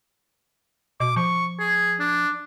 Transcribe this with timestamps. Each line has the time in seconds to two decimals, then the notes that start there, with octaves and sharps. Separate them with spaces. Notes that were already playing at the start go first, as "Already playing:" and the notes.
1.00 B2 D6
1.16 F3 C#6
1.59 G#4
2.00 D4